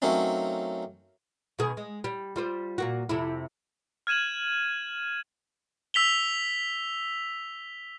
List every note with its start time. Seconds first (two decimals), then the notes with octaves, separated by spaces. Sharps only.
0.02 F#3 A3 A#3 C4 C#4 D#4
1.59 B2 D#3 G#4
1.77 G#3
2.04 G3
2.36 G3 F4 C5
2.78 A#2 A#3 F#4
3.09 F2 C3 E4
4.07 F6 G#6 D#7 E7 F#7
5.94 E6 B6 F7 G7